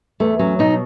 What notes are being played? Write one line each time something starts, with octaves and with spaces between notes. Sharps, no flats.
E2 A3
F#3 C#4
B2 D#4